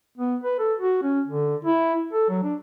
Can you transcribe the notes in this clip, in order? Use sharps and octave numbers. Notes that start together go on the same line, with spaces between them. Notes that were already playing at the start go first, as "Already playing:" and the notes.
B3
B4
A4
F#4
C#4
D3
E4
A4
F#3
D4